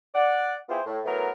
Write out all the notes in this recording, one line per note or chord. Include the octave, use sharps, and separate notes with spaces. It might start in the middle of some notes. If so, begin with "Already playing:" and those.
D5 F#5
B3 E4 F4 G4 G#4 C5
A2
E3 F#3 A3 B3 A#4